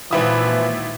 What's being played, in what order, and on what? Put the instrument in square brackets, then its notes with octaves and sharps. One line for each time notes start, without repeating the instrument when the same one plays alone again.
[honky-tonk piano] G#1 E4 D#6 [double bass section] A#2 [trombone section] E3 F3 B4